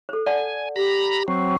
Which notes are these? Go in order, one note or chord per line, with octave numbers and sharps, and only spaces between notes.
A4 C5
D5 F#5 G#5 A5
G4 A#5 B5
F#3 C4 C#6